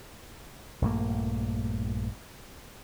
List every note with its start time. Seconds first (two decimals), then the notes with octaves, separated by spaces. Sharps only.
0.82 A#1 G2 A3 A#3